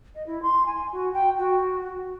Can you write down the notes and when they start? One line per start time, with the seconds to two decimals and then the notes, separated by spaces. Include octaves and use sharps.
0.15 D#5
0.26 E4
0.42 C6
0.65 G#5
0.92 F#4
1.13 G5
1.38 F#4